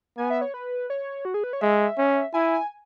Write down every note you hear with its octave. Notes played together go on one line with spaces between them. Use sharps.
B3 G#5
E5
C#5
B4
C#5
F#4
G#4
B4
C#5
G#3 E5
C#4
E4 G#5